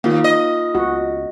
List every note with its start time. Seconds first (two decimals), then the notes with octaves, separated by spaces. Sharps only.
0.04 D#2 A#3 F4 F5
0.24 D#5
0.75 C#2 F#4